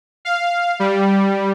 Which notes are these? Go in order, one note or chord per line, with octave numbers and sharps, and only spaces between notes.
F5
G3